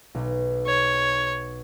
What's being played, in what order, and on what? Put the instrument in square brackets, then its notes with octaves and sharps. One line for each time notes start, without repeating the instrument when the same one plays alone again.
[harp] B1
[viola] C#5